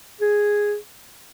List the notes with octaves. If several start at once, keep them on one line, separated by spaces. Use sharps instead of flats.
G#4